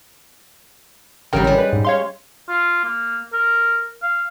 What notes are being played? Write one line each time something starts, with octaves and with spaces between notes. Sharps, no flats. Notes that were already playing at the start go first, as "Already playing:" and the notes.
A1 C#3 F#3 G3 A#4 G5
G3 G#3
B4
G#2
C#5 F5 C6
F4
A#3
A#4
F5